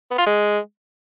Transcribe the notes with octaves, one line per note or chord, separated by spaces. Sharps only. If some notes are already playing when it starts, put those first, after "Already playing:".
B3
F4
G#3